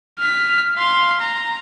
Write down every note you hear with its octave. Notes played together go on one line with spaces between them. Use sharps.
F6 B6
F5 C6
A#5